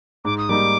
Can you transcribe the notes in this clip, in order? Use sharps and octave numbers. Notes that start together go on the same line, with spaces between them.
G#2 D6
D#6
G3 A#3 D#4 D6